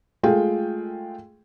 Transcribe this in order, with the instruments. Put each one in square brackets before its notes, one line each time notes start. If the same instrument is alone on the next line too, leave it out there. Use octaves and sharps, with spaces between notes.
[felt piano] G#3 A3 F4 G#4 G5